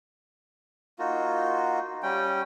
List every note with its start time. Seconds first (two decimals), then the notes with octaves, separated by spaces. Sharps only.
0.99 A#3 D#4 F4 F#4
2.03 G3 C#4 G5